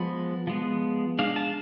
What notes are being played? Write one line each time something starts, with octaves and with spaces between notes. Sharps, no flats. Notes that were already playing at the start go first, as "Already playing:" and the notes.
Already playing: F3 G#3 B3 B5
F3 G#3 B3
G#3 D4 F5
A5